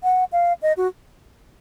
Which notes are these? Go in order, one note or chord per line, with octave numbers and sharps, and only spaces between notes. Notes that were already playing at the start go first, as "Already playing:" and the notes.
F#5
F5
D#5
F#4